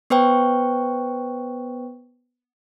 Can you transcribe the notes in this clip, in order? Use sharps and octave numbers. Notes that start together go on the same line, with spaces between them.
B3 B4 C5 G5 C#6